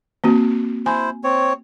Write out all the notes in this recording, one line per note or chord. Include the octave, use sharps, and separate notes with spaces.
A#3 C4 F#4
E4 C5 G#5
C4 C#5